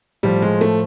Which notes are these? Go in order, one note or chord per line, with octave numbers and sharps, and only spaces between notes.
A2 F3 G3
G#3
A3